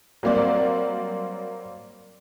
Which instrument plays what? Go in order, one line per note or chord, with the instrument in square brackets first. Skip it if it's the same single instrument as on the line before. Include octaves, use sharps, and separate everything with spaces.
[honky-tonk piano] F#3 G3 A#3 C4 D5